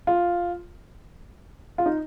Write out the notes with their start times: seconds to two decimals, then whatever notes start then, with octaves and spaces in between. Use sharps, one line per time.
0.07 F4
1.78 F4
1.86 D#4